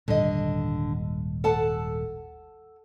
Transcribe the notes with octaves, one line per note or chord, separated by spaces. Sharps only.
D#1 G#1 D3 G3 D#5
A4 F#5 A5